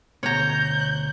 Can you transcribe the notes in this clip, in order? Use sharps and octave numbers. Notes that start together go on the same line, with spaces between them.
D2 B2 C#5 A#5 G6